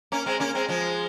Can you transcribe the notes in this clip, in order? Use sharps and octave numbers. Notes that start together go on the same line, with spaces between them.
A#3 C#4
G#3 C4
A#3 C#4
G#3 C4
F3 G#3